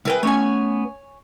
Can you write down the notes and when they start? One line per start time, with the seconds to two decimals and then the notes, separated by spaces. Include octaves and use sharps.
0.05 C2 E4 G#4 A#4 B4 G5
0.23 A3 B3 C#4 C#5 G#5